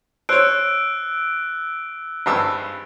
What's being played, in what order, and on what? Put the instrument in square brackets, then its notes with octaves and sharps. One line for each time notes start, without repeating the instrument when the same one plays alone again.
[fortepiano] C5 C#5 [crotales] E6 F#6 D7
[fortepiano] G#1 G2 E6